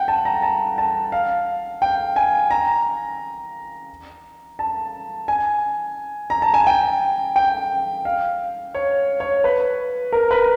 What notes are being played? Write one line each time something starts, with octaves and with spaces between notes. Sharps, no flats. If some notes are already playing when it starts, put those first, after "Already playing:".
Already playing: F#5 G5
A5
A#5
A5
A5
F5
G5
G#5
A#5
A5
G#5
A#5
A5
G#5
G5
G5
F5
C#5
C#5
B4
A#4
B4